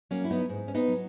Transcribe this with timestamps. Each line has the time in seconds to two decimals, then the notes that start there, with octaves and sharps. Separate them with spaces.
0.11 F#3 A#3 C#4
0.25 E4
0.31 B3 D#4
0.49 G#2
0.68 C#4
0.75 B3 D#4
0.88 F#3